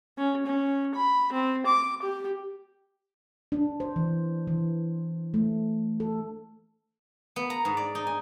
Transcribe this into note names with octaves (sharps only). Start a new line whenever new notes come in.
C#4
C#4
B5
C4
D6
G4
D4
C5
E3
E3
A3
A4
B3
A#5
G#2
D5
D#4
G#5